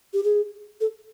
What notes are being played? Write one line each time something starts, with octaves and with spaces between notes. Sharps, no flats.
G4
G#4
A4